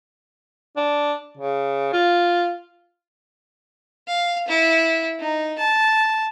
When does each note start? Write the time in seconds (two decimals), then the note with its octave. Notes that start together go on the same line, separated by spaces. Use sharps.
0.77 D4
1.37 C#3
1.93 F4
4.08 F5
4.48 E4
5.20 D#4
5.59 A5